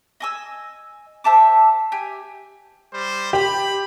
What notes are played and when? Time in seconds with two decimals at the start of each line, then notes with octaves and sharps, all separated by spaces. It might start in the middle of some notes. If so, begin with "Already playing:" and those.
0.20 D#5 G#5 E6
1.24 C5 E5 A5 D6
1.92 G4 G#5
2.94 G3 C5
3.33 G4 B5